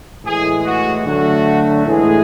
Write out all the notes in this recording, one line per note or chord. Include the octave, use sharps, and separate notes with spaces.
A2 E3 G#3 G#4
F#4
D3 F#3 A3 F#4
A2 E3 G#3 G#4